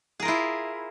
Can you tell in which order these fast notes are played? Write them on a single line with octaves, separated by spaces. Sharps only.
G#4 A#4 F4 E4